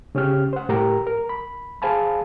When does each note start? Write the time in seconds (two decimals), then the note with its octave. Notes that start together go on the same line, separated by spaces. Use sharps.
0.15 C#3 C#4 G4 F6
0.53 C5 F#5
0.69 A2 G4 A#4 A#5
1.07 A#4
1.29 B5
1.82 G#4 C5 F5 G#5 A5 B5